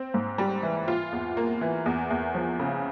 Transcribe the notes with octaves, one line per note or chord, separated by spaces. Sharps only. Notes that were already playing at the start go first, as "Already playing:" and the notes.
Already playing: C4
G#2
G3
E3
F4
E2
A#3
E3
E2
E2
F3
C#3